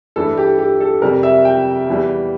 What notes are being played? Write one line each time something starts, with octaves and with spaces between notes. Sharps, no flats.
G2 E3 A3 A4
G4
G4
A4
F2 C3 G3 A#4
E5
G5
E2 E3 G3